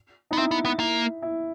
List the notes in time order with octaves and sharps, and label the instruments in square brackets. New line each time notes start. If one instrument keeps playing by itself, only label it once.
[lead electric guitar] B3 [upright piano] D#4
[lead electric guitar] C4 [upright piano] E4
[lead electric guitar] B3
B3
[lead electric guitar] A#3 [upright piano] E4
[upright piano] E4